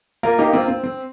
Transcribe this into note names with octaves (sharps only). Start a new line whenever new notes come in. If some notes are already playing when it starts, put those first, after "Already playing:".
A#3 F4 A#4
A#3 D#4 G4
A#3 C4 F4
C4
C4